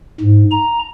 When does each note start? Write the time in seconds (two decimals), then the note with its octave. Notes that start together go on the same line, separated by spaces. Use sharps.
0.20 G#2
0.51 A#5